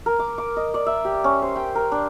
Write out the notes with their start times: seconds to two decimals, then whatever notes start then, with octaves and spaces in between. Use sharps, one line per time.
0.06 A#4
0.19 D6
0.38 D6
0.57 D#5
0.74 D5
0.86 E5
1.05 G4
1.24 C#4
1.42 C5
1.56 G5
1.75 A#4
1.92 D4